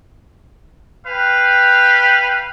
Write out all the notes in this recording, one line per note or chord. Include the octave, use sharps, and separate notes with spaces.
B4 F5 G5